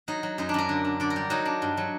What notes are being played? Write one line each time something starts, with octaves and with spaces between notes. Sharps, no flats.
F#3 D#4
F#3
F#2 D#4
D4
F#2 A#4
D3
D4
D3 D5
A#4
G3
F#3 D#4
D4
G2
F#3